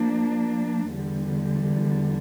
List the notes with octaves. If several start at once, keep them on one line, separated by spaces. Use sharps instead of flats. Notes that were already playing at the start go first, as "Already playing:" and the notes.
Already playing: F3 A#3 D4
E2 D3 G3